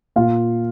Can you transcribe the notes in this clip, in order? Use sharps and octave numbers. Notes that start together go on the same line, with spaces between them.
A#2 F4 F5